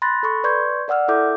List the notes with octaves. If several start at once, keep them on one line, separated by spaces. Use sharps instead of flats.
B5 C6 F#6 A6 A#6
A4 B5 C#6
B4 D5 C6 C#6 G6 G#6
A#4 D5 F#5 E6 F6
E4 A4 E5 D6 G6